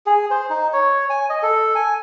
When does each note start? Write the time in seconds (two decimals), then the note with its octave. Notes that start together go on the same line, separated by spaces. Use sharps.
0.06 G#4
0.31 C5
0.50 D#4
0.73 C#5
1.10 G#5
1.29 D#5
1.43 A4
1.75 G#5